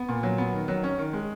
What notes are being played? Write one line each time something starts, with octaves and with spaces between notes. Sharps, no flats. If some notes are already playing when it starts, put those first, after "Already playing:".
Already playing: B3
A#2
F#3
B3
D#3
F#3
C#4
D#3
G#3